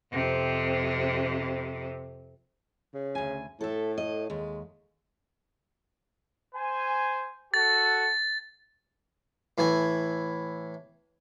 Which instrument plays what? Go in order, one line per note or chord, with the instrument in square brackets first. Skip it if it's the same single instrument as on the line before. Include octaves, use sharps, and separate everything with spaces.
[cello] F2 C3
[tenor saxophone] C#3
[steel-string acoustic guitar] D2 G#5
[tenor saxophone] A2 [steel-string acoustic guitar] A4 E5
[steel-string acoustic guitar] D#5
[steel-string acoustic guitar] D#2 [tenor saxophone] G#3
[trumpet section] C5 G#5
[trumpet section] F#4 A4 [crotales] A6
[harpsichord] A2 E3 G#5